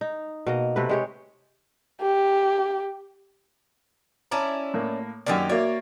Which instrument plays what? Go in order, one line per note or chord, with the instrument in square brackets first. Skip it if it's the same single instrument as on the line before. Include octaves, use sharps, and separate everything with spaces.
[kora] D#4
B2 A#3 D#5
C3 A3 B4
G#3 G4 C#5
[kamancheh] G4
[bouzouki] C#4 E4 D5 [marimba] C#5 A5 A#5
[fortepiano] A2 A#3
[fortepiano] F#2 D#3 D5 [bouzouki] A#3 C#4 G4
[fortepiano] A#3 D5 [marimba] F#4 E5 [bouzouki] C#5